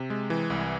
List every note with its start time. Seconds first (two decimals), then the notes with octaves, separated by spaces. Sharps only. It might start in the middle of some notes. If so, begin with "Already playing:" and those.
Already playing: C3
0.10 G#3
0.30 E3
0.50 C2